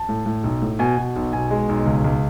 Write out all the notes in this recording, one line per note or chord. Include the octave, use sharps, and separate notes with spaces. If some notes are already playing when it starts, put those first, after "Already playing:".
Already playing: A5
A2
A2
B1
A2
B2 G#5
B2
B1
B2 G#5
G#3
B1
C#2
C#2